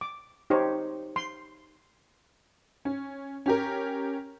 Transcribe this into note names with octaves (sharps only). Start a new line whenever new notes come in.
D6
D#4 G4 C5 C#5
C6
C#4
C#4 G4 A#4